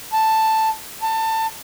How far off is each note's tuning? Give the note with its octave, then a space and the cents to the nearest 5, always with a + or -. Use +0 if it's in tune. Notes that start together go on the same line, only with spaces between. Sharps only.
A5 +5
A5 +25